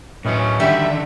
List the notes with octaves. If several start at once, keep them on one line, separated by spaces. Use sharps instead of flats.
A2 D#3 E3 F#3 C#4
D3 D#3 G3 F#4 E5